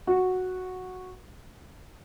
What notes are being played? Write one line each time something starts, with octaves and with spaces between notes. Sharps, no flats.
F#4